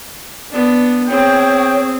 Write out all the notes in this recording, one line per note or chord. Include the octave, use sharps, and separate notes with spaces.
B3 D4
C4 G#4 C#5 G5